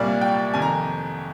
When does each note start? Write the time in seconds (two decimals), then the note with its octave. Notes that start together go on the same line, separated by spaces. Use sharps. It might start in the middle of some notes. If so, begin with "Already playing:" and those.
Already playing: C2 A#2 G3 A#3 D5
0.21 G5
0.54 F2 C3 D#3 G#5
0.62 A#5